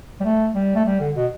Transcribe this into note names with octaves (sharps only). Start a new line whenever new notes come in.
G3
A3
G3
A3
G3
D3
B2